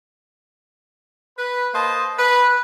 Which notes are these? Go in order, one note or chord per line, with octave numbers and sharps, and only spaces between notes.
B4
A#3 C5 D#5 A5
B4